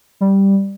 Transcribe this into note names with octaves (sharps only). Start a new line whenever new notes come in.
G3